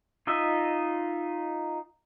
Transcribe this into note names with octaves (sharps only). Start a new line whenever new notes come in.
D#4 F4 D#5 E5